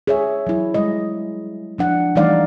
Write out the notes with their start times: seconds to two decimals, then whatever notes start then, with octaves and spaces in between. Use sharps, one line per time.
0.07 G#4 C#5 E5
0.47 F#3 E4
0.74 G3 G#3 D#5
1.78 F3 D4 F#5
2.16 E3 G3 A3 D#4 D5 F5